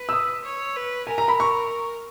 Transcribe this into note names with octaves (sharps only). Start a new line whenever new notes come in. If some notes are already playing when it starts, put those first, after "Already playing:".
Already playing: B4
E6
D#6
C#5
B4
A#4 G#5
A#5
B5
C#6